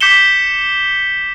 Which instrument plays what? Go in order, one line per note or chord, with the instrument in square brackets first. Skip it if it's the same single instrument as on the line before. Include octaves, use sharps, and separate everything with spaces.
[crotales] D6 G6 B6 C#7 E7 G7